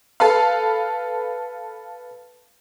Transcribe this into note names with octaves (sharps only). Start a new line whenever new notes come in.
A4 B4 F5